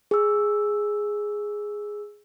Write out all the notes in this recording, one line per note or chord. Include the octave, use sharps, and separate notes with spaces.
G#4 E6